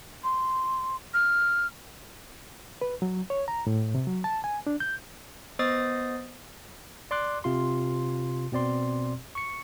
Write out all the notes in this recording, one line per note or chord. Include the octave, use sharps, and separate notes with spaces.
C6
F6
B4
F#3
C#5
A#5
A2
C3
F#3
A5
G#5
D4
G6
B3 C5 D#5 D#6 A6 C7
D5 C6 D6 F#6
C3 F4 C6
B2 C4 D5 C6
C#6 C#7